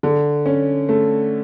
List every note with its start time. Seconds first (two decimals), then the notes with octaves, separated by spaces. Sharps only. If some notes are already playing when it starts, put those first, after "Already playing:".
0.03 D3
0.46 C#4
0.89 A3